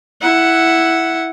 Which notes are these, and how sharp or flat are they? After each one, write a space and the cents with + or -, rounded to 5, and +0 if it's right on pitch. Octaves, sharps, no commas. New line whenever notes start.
E4 +0 F#5 +0